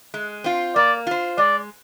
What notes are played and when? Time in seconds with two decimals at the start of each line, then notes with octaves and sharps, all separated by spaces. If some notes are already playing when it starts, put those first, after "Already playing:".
0.14 G#3
0.44 C4 F4
0.76 A#3 D5
1.07 F4 C5
1.38 G#3 D5